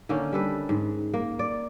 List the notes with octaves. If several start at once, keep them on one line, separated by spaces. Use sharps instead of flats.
D3 D#3 A#3 C#4
G3 A4 B4
G#2
A#3
D5